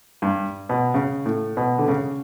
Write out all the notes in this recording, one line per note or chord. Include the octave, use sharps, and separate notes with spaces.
G2
B2
C#3
A2
B2
D3
C#3